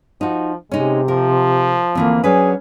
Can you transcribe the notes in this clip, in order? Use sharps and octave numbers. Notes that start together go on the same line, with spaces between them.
F3 D#4 F#4
C3 G#3 C#4 D#4
F3 A#4
D2 E3 A#3 C4
F#3 C#4 D4 G#4 B4